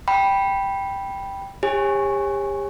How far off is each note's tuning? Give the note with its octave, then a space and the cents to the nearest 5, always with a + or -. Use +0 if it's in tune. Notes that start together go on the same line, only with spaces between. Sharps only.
G5 +0 B5 -10
G4 +35 C#5 -25 G#5 +0